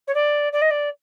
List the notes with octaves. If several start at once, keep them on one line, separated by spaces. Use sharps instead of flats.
C#5
D5
D5
D#5
D5